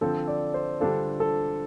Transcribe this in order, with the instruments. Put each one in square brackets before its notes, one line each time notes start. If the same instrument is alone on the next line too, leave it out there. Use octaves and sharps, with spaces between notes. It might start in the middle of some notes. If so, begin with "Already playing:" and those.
[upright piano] D3 F3 C4 [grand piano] A4
[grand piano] D5
C5
[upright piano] D3 G3 D4 F4 [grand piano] A4
[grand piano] A4